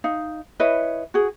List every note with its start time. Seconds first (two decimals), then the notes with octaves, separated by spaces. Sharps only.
0.04 D#4 F5
0.60 E4 B4 C#5 D#5
1.14 F#4 G#4